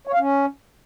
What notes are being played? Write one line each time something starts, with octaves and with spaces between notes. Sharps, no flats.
C#5
F5
C#4